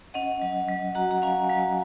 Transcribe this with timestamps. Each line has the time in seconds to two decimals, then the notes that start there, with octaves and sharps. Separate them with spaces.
0.14 C#4 D#5 F#5
0.42 F#3
0.68 F#3
0.95 F#4 F#5 A#5
1.11 A#5
1.22 C#4 F5 G#5
1.49 F#3 F5 G#5